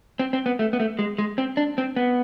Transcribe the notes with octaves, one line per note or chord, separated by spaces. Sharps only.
C4
C4
B3
A3
B3
A3
G#3
G#3
C4
D4
C4
B3